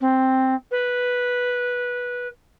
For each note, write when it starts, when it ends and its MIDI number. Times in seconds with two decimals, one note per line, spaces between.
0.01 0.55 60
0.71 2.28 71